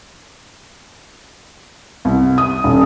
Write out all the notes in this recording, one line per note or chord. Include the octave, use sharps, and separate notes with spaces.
C2
D#6
D#1